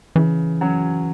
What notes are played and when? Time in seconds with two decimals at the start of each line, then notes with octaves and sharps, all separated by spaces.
0.15 C#3 E3
0.61 F#3 C#4